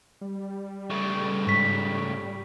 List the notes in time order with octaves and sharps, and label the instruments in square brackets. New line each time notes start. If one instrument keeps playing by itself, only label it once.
[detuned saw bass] G3
[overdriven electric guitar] C#3 A3
[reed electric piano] G#2 [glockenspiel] C#6 B6